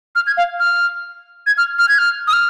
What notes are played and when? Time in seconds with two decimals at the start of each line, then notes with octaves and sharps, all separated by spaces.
0.16 F6
0.27 G#6
0.37 F5
0.60 F6
1.47 G#6
1.58 F6
1.79 F6
1.89 G#6
1.98 F6
2.27 D#6
2.33 F6